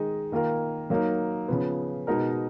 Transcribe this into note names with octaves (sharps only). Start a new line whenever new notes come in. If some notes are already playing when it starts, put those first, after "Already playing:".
Already playing: D#3 G#3 D#4 G#4 D#5
D#3 A#3 F4 A#4
F#3 A#3 D#4 A#4
C#3 F3 B3
B2 G#3 D#4 A#4 D#5